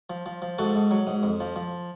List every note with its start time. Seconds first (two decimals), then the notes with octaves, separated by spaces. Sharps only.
0.10 F3
0.26 F3
0.42 F3
0.58 G#2 F#4 A4
0.75 G#2
0.91 F#3
1.07 G#2
1.23 F2
1.40 F3
1.56 F3